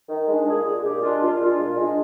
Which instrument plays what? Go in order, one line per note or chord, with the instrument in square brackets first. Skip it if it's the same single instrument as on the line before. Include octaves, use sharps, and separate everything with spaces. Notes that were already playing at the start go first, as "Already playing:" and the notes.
[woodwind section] D#3
G#3 D4
A#2 G#4
G#3 D4 G#4
A#2 G4
G#3 D4 F4
A#2 F4
G#3 D4 F4
A#2
G#3
D4